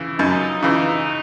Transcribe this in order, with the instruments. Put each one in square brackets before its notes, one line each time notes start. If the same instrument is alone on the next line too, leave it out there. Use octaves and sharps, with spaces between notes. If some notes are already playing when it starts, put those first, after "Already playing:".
Already playing: [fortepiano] C#3 E3
[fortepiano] F#2 [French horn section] D#4
[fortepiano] C#3 E3